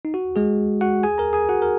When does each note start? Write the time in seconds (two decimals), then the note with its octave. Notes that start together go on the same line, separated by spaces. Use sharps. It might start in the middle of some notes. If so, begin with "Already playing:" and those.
0.05 D#4
0.14 F#4
0.36 G#3 G#4
0.81 F#4 F#5
1.03 G#4 G#5
1.18 A#4 A#5
1.33 G#4 G#5
1.49 F#4 F#5
1.62 A#4